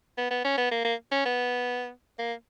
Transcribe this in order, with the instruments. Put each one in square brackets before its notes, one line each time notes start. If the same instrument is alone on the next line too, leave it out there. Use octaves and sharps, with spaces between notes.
[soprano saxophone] B3
B3
C#4
B3
A#3
A#3
C#4
B3
A#3